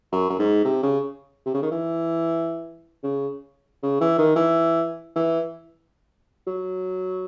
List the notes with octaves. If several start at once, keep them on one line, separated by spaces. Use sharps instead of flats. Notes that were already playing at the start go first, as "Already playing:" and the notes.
F#2
F#2
G#2
C3
C#3
C3
C#3
D#3
E3
C#3
C#3
E3
D#3
E3
E3
F#3